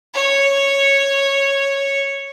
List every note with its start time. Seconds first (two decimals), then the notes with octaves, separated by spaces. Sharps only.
0.14 C#5